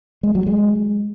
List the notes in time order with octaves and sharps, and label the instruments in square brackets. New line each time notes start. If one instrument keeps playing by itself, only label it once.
[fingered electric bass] G#3
F#3
G#3